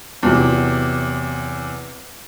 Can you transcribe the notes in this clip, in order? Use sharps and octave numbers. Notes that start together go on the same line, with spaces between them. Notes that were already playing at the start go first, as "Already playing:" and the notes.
E2 C3 F#3